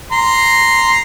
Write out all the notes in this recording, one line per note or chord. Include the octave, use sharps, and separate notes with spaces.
A#5 C6